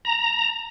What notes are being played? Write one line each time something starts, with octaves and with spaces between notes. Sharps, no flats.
A#5